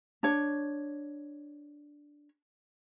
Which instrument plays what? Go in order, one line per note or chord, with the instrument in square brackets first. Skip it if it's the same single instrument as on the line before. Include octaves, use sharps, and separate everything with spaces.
[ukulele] D4 C#5